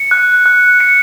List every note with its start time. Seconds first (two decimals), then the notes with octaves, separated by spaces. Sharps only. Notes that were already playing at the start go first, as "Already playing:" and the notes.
Already playing: C#7
0.11 F#6
0.46 F#6
0.80 C#7